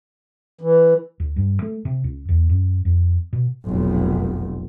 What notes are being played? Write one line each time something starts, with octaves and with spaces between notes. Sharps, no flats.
E3
D2
G2
A3
C3
C#2
E2
F#2
F2
B2
F1 B1